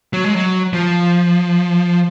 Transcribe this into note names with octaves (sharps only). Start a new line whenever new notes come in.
F#3
G#3
F#3
F3